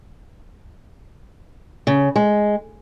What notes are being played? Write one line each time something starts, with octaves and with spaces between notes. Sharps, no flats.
C#3
G#3